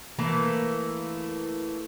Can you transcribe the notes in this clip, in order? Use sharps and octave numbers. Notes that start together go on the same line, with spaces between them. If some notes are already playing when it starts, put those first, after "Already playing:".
E3 A3 A#3